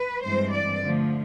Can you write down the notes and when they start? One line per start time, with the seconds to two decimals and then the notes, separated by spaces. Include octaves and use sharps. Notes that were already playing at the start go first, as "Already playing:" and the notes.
Already playing: B4
0.22 G2 E3 G#3 C4 C5
0.51 D5
0.79 D3 F3 A3